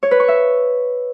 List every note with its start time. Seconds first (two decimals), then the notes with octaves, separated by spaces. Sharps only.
0.03 C#5
0.11 B4
0.20 C#6
0.28 E5